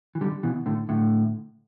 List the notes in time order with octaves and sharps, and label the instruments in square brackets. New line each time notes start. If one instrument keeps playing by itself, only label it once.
[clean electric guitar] E3
D3 G3
B2 E3
A2 D3
A2 D3